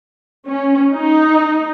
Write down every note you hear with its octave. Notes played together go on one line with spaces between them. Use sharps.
C#4
D#4